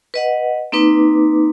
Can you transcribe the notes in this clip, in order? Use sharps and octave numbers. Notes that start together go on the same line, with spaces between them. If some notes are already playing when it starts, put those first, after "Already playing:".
B4 D#5 F#5
A#3 C4 D#4 B4 D6